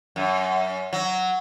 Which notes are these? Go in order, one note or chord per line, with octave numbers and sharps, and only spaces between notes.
F#2
F#3